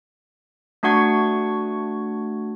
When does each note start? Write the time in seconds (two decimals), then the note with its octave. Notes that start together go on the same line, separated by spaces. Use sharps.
0.83 A3 D4 F#4 F#5 C#6 G#6